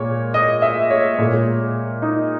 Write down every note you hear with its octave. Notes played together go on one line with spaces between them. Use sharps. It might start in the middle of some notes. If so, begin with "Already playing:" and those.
Already playing: A#2 G#3 C#5
D#5
E5
C#5
A#2 G#3
D#4